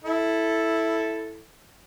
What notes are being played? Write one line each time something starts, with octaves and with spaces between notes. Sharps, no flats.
E4 A4